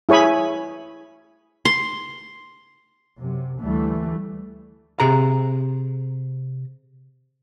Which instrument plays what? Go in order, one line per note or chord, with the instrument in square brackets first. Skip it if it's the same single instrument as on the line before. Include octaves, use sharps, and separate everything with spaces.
[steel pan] E4 G#4 C#5 G#5 B5
[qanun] C6
[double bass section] F#2 C3
D2 E3 G3 A3
[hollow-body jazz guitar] C3 G#4 A#5